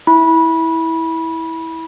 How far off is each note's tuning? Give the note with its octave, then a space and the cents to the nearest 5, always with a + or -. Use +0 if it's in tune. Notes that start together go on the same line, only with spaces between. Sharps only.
E4 -15 B5 -20